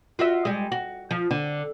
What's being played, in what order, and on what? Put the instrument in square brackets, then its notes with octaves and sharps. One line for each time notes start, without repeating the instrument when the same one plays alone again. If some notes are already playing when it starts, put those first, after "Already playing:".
[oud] F4 F#4 E5
G3 G#3
F#4
F3
D3